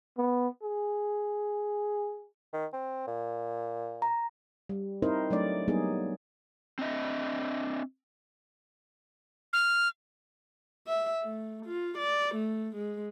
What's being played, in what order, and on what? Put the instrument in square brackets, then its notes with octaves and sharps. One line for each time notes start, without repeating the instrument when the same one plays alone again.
[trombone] B3
G#4
[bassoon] D#3
C4
A#2
[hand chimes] A#5
[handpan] G3
C4 D#4 E4 A#4 C5 D#5
F#3 A3 D4 D5
F#3 G3 A#3 B3 D#4 G#4
[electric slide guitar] C4 D4 D#5 E5
[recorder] F6
[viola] E5
A3
F4
D5
A3
G#3